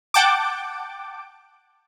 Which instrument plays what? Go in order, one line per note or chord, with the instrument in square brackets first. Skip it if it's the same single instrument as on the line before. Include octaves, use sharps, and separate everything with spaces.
[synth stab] F#5 G5 A5 D6